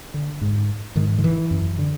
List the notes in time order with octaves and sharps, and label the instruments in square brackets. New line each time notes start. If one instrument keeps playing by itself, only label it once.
[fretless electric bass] D3
G#2
G#2 D#3
D#3
E3
F#2
D3